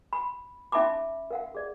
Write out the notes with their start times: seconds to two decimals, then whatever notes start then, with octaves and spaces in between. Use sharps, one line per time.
0.13 B5
0.72 C#4 D#4 E5 A5 B5 D6
1.30 A#4 F5 F#5
1.55 G#4 D5